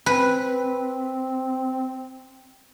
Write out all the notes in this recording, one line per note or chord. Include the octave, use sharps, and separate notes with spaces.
C4 B4